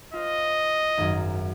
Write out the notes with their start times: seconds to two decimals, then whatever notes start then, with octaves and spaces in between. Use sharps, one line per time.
0.13 F4 C5 D#5
0.97 G#1 F#2